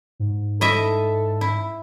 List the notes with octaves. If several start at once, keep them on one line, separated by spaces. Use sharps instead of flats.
G#2
E4 A4 D#5 E5
E4